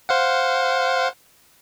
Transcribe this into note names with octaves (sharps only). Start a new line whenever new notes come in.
C5 F5 F#5